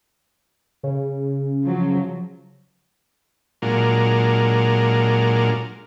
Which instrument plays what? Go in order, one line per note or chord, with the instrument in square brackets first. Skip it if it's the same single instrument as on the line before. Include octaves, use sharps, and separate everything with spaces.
[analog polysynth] C#3
[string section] F3 F#3
[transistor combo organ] A#2 F#3 G#3 D4 F4 A#4